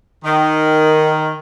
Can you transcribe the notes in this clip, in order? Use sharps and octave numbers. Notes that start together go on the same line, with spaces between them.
D#3